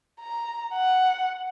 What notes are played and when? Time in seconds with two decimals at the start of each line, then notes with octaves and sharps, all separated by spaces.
0.21 A#5
0.74 F#5